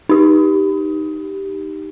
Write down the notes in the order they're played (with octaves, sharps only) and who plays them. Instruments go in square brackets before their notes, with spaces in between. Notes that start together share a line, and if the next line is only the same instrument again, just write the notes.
[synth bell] D#4 G4